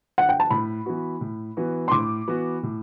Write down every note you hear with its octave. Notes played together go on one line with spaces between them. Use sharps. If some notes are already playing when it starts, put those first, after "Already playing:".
F#5
G5
A5
A2 B5
E3 B3 F#4
A2
E3 B3 F#4
C6
A2 D6
E3 B3 F#4
A2